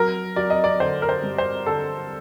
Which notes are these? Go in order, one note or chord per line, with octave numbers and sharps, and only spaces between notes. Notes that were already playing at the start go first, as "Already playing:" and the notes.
Already playing: F#3 A#4
F#3 D5
D#5
D5
D3 C5
A#4
C5
G2
C5
D3 A4